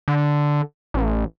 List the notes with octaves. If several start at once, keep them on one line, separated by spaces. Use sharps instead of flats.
D3
A1